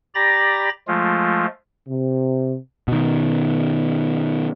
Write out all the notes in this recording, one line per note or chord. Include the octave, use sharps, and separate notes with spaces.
G4 D5 A#5 B5 A6 A#6
F3 G#3 A3 F4
C3
B2 D#3